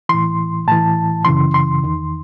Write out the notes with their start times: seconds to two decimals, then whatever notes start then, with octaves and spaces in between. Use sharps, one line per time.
0.09 A2 E3 C6
0.68 A2 E3 A5
1.25 F#2 C#3 E3 C6
1.54 C6
1.83 E2 D#3